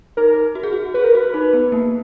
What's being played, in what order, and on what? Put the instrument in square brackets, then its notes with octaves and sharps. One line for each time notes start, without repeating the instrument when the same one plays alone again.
[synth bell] D#4 [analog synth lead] A#4
[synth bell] F#4
G#4
F#4
[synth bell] G#4 [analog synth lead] B4
[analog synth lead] A#4
[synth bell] F#4 [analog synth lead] B4
[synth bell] D#4
B3
A#3